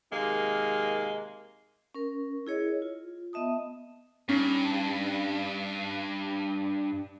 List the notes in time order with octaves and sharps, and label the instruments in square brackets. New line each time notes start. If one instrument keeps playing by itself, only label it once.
[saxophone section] C3 D#3 G#3 A#3
[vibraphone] C#4 A#4
E4 G#4 C#5 D#5
F4
B3 D#5 E5 A5 D#6
[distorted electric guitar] G2 [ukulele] C#4 D#4